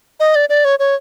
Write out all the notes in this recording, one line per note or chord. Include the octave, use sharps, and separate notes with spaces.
D#5
D5
D5
C#5
C#5